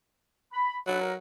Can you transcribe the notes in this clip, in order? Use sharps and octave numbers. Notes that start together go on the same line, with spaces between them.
B5
F#3 D4 A4 B4
A#4